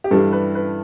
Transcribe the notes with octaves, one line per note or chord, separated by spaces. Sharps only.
G4
G2 E3 G3 D4 A4
B4
B4